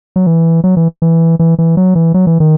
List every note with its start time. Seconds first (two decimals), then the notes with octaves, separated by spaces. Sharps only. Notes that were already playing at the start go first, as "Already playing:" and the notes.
0.16 F#3
0.27 E3
0.64 F#3
0.77 E3
1.02 E3
1.39 E3
1.58 E3
1.77 F#3
1.95 E3
2.14 F#3
2.27 E3
2.40 D#3